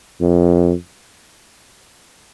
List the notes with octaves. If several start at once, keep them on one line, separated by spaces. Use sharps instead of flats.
F2